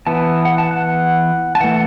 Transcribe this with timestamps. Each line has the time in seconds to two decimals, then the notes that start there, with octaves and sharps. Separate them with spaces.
0.07 E3 B3 A5
0.45 F#5
0.58 A5
0.71 F#5
1.55 A5
1.61 E3 A3 F#5